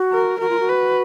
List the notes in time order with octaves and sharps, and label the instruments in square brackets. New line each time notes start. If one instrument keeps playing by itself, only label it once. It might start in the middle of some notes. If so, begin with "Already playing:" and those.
Already playing: [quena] F#4
[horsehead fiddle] A#4
[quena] F#4 [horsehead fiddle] A#4
[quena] F4
F#4
[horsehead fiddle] B4